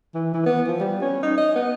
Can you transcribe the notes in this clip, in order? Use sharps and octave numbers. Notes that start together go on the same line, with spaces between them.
E3
E3
B3
F3
G3
C#4
D#4
D#5
B3